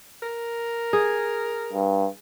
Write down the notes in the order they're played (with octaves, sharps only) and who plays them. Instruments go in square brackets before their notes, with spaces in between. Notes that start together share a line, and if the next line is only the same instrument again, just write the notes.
[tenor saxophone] A#4
[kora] G#4
[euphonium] G2